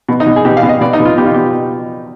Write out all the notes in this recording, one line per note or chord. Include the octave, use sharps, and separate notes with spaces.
B2
D#4
B2
G#4
B2 G4
F5
B2
D#5
B2 D5
D#4
B2
F4
B2 G4
F4
B2 G4